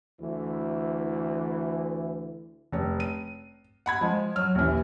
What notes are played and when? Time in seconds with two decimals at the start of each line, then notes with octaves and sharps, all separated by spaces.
0.19 D2 E3
2.72 F1 C#5
3.00 D#7
3.86 F#5 B5 G#6
4.01 F3 G#3
4.36 F#3 F6
4.55 A#1 D#2 E3